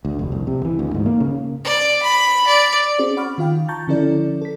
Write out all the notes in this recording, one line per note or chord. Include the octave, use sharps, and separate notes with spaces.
D2
F1
C2
C3
E3
D2
G#2
A#3
C#3
D5
B5
D5
C4 C#4 F#4 G#4 C5 D5
F#5 B5 C#6 D6 F6
D#3 F4 F5 G5
A5 A#5 C#6 G6 A6
D3 F3 C#4 E4 A4 D5
A4 B6